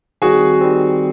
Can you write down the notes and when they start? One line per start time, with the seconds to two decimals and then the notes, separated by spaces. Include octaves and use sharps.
0.22 D#3 G3 C4 F#4 G#4
0.61 D#3 G3 C4